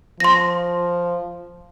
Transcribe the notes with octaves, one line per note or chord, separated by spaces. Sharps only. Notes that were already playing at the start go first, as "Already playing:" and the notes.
F3 C6 A#6